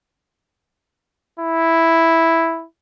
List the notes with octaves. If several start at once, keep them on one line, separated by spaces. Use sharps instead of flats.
E4